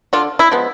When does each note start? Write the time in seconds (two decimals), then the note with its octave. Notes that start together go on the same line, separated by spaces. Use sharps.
0.13 D3 F4
0.39 E4
0.51 F3 G#3 B3